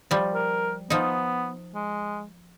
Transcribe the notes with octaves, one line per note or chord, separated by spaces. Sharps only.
F3 G3
A#4
F3 B3 D#4
G#3